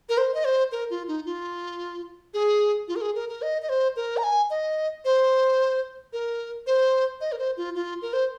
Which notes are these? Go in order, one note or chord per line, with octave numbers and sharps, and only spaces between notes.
A#4
C5
D#5
C5
A#4
F4
D#4
F4
G#4
F4
A#4
G#4
A#4
A#4
D#5
D#5
C5
A#4
A#5
G#5
D#5
C5
A#4
C5
D#5
A#4
C5
F4
F4
A#4
C5